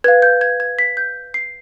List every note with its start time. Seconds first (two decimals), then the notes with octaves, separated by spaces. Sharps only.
0.04 B4 F5 G#6
0.22 G6
0.41 G#6
0.60 G#6
0.79 B6
0.97 G6
1.34 C7